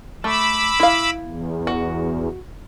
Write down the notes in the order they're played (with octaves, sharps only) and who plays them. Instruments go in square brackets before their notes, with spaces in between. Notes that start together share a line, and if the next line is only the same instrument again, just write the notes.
[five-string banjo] A3 [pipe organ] B5 D6 E6
[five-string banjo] E4 F5
[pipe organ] E2
[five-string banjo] F#4